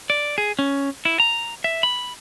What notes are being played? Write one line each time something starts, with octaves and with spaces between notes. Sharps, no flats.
D5
G#4
C#4
E4
A#5
E5
B5